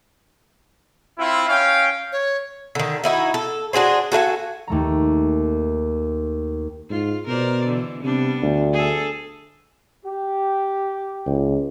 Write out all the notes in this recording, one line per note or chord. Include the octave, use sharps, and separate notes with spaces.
C4 E4 F4
C#4 F5 G5
C#5
D3 D#3
D#4 E4 F#4
A4
D4 F#4 G#4 C5
F#4 A4 F5 G#5
D#2 A3 A#5
G#2 F4
B2 A#4 C5 D5
D3 E3
C3 G3 B3 D4
D2
G#4 A4
G4
C#2